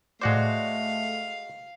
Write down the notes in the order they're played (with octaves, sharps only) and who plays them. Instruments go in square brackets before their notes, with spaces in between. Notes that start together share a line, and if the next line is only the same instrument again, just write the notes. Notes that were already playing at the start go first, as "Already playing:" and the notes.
[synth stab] A2 D5 [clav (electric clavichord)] G#3 F#4 C5 [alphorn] A3 [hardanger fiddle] F5